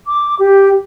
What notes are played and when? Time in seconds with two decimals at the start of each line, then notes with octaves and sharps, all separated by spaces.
0.07 D6
0.39 G4